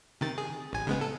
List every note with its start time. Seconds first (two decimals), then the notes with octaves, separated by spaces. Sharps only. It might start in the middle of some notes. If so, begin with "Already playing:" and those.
0.21 C3 D#3 A6
0.38 G#4
0.73 A1 G#5
0.87 C#3 G#3 B3
1.01 A4